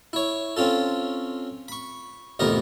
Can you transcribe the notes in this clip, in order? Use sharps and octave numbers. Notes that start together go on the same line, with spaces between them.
E4 C#5
C4 C#4 F4 A4
B5 C#6
A1 F2 C3 B3 A#4 D#5